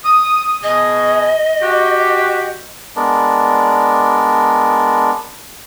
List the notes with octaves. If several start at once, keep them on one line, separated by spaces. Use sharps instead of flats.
D#6
B2 G#4 D#5 D#6
F#4 G4
G#3 B3 D4 A#4 D5